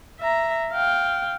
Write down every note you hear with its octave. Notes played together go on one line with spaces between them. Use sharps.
E5 A#5
F5 G5